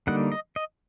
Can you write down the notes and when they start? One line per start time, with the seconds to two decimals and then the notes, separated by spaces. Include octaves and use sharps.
0.07 D3 G3 A#3 D#4 F#5
0.32 D#5
0.56 D#5